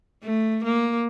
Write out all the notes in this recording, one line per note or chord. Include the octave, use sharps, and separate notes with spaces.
A3
A#3